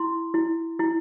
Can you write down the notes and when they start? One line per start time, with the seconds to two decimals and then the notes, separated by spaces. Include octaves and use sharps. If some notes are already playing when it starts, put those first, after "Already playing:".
Already playing: E4 C6
0.34 E4
0.79 E4